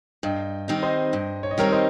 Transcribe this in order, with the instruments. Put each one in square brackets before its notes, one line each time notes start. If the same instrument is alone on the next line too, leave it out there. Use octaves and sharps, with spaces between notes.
[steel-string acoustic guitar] G2 [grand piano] D#5 G5
[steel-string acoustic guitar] D#3 G3 C4 D#4
[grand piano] C5 D#5
[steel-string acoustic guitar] G2
[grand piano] C#5
D#5
[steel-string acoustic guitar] D#3 G3 C4 D#4 [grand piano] A#4 C#5
[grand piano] C5 D#5